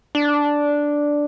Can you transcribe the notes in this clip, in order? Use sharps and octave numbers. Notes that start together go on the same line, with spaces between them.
D4